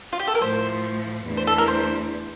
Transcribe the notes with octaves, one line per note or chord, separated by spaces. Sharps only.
F4
G4
A4
A#4
A2 F3 A3 C5
E2 E3 A3 D4
C5
A4
A#4
C5